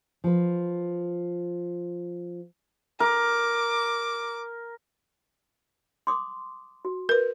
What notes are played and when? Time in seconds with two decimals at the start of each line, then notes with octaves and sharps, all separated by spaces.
0.24 F3 B4
3.00 A#4 D6
6.07 C6 D6 D#6
6.85 F#4
7.09 A#4 B4